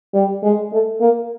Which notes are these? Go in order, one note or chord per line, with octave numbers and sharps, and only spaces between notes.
G3
G#3
A3
A#3